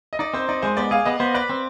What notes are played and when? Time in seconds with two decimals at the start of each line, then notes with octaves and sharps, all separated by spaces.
0.13 D#5
0.19 D#4 D5
0.34 C4 C5
0.49 D#4 D5
0.62 G#3 C5
0.77 B3 D5
0.91 G#4 F5
1.05 B3 D#5
1.20 B3 C5
1.34 B4 D5
1.49 C4